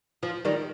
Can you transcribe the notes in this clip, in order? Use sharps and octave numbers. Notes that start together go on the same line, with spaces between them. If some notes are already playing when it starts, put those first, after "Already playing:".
F3
D#3 G3